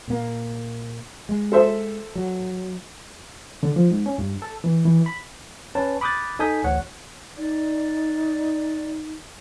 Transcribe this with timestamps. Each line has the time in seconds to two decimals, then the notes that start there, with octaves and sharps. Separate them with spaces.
0.08 A#2 A#3
1.29 G#3
1.52 A4 C5 E5
2.15 F#3
3.63 D3
3.76 F3
3.91 G#2
4.06 C#4
4.18 G2
4.42 A4
4.64 E3
4.85 E3
5.06 B5
5.75 C#4 B4 C#5 A5
6.01 B5 D6 D#6 F#6 G6 A6
6.39 D#4 A4 G#5 D#6 G6 B6
6.64 A1 D2 C#5 F#5
7.37 D#4 D5